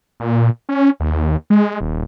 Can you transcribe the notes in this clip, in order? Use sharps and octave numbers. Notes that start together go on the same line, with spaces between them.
A#2
C#4
D#2
G#3
D#1